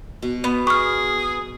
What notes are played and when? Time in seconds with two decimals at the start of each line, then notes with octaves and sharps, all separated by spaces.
0.22 B2
0.44 B3
0.67 G#4 C#6 F6